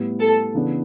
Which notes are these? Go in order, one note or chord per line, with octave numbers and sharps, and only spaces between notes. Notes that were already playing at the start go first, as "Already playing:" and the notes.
Already playing: A2 G3 B3
A4
C#3 E3 B3 D4